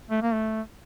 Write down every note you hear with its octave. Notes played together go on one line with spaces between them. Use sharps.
A3
A#3
A3